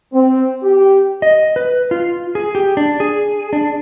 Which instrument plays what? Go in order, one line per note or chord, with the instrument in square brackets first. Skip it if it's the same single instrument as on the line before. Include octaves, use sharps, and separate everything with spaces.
[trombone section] C4
G4
[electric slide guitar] D#5
B4
F4
G#4
G4
D4
G#4
D4